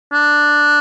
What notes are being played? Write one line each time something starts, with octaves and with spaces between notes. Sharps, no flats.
D4